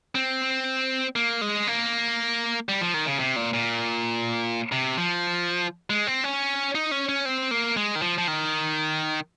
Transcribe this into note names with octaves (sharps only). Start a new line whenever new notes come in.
C4
A#3
G#3
A#3
G3
F3
D#3
C#3
C3
A#2
A#2
C3
F3
G#3
C4
C#4
D#4
C#4
C#4
C4
A#3
G#3
D#3
F3
F3
D#3